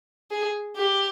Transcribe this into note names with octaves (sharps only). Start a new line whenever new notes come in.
G#4
G4